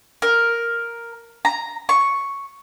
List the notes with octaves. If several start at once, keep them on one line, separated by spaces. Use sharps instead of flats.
A#4
A#5
C#6